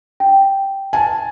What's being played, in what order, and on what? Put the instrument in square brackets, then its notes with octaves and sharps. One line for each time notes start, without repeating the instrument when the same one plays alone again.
[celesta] G5
[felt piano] G#5 A5